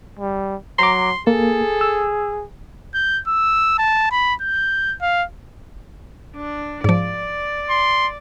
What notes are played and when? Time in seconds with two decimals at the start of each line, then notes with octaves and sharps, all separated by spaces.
0.19 G3
0.79 F#3 A#5 C6 D6
1.27 A#3 G#4 A4
1.81 E6
2.94 G6
3.27 E6
3.78 A5
4.11 B5
4.41 G6
5.02 F5
6.37 D4
6.84 G#2 F3 D5
7.70 C6